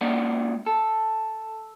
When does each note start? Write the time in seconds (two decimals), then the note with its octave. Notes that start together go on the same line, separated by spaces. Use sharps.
0.01 A#2 G#3 A#3 C#4 D5 F#5
0.66 A4